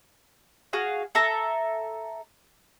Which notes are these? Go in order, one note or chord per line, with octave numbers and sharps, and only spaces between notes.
F#4 G#4 F5
A4 E5 A#5